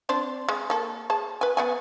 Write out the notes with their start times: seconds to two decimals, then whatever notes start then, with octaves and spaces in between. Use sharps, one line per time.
0.09 C4 D4 C5
0.49 G#3
0.70 A#3 A4
1.10 G#4 A5
1.41 B4 G#5
1.57 B3 F#5 G#5